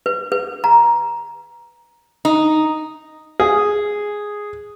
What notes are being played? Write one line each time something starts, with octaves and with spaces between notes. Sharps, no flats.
B4
B4
A#5
D#4
G#4